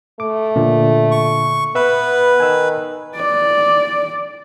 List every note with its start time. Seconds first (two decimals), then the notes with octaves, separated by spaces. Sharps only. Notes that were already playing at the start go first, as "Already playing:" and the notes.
0.20 A3 D6
0.56 A#2 D3
1.11 C#6
1.75 B3 B4 E5
2.40 D#3 G#5 E6
3.16 D5